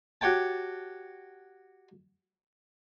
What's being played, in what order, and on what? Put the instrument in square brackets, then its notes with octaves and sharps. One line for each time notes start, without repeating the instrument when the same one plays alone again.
[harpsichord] F#4 G4 C#5 G5 A5